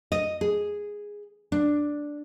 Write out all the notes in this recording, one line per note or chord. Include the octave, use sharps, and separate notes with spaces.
D#5
G#4
D4